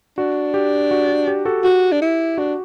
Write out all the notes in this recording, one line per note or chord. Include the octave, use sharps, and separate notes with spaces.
D4 F#4
G4
F#4
G4
G4
F#4 A4
F#4 G4
D4
E4
D4 F#4